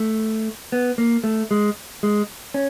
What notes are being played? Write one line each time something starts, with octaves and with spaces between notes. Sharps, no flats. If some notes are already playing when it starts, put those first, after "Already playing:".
Already playing: A3
B3
A#3
A3
G#3
G#3
C#4